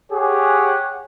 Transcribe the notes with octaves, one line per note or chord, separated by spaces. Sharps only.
G4 G#4 C#5 F#5 G#5